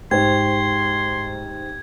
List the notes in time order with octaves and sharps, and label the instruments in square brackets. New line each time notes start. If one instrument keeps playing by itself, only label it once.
[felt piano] G#2 C5 [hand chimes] G4 G5 [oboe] C6 [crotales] G#6